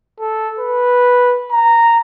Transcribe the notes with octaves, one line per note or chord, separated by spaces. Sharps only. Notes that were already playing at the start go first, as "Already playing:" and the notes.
A4
B4
A#5